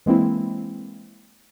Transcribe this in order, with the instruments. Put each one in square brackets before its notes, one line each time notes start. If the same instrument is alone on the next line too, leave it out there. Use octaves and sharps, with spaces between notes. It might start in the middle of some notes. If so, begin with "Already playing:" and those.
[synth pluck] E3 G#3 A#3 C4 E4